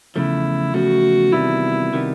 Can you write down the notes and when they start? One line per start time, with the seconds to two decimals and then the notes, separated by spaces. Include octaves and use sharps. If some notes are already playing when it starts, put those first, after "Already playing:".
0.15 E2 C#3 F3 A3 E4
0.74 E2 C#3 F3 A3 F#4
1.32 E2 C3 D#3 G3 B3 E4
1.93 C3 D#3 G3 B3